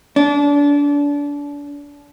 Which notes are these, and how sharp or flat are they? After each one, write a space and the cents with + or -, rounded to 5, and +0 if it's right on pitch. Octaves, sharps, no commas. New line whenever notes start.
D4 -30